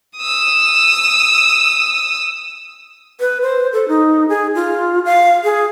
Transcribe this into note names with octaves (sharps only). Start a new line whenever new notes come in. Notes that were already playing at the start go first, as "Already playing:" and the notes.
D#6 E6
B4
C5
A4
D#4
G#4
F4
F5
G#4